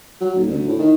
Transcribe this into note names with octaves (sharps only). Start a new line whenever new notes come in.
F#3
D#1
D2
A2
D#3